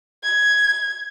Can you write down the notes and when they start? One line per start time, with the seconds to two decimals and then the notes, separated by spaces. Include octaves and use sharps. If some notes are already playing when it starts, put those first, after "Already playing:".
0.23 G#6